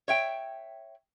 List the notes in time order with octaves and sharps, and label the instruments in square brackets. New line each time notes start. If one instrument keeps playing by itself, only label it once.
[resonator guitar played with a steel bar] C#5 E5 G5